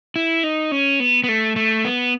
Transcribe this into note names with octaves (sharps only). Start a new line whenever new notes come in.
E4
D#4
C#4
B3
B3
A3
A3
B3